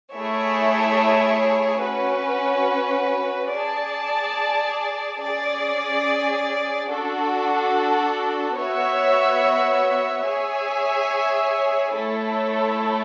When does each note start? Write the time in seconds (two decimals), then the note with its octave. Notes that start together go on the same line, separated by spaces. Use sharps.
0.15 A3 E4 G#4 C#5 E5
1.83 C#4 F#4 B4
3.51 G#4 D5 A5
5.20 C#4 G#4 D5
6.88 D4 F#4 A4
8.57 B3 F#4 C#5 E5
10.26 G#4 C#5 E5 G#5
11.94 A3 E4 A4 C#5